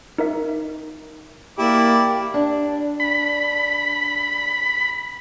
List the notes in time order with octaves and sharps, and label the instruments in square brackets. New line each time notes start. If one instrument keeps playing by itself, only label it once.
[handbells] D#4 A#4 E5
[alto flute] A#3 [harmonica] E4 D5 D6 [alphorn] G4
[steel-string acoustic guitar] D4
[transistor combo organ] B5